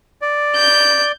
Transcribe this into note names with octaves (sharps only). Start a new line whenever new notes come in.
D5
G6